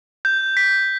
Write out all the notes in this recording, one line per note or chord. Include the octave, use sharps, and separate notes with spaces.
G6
B6